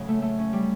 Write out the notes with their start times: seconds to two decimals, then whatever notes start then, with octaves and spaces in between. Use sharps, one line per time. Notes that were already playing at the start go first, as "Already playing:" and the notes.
Already playing: A2 C#3 F#3
0.08 A3
0.22 A3
0.38 C#4
0.53 G3